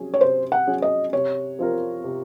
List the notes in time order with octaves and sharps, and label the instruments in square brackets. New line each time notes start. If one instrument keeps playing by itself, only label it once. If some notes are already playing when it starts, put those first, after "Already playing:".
Already playing: [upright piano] C3 F#3 C#4 G#4
[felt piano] C#5
[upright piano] C3 [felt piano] C5
[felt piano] F#5
[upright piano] F#3 C#4 G#4
[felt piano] D#5
[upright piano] C3 [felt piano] C#5
[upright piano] F3 C4 F4 A#4
C3